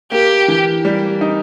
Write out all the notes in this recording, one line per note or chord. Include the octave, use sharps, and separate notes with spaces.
A#3 G4
E3
G3
D#4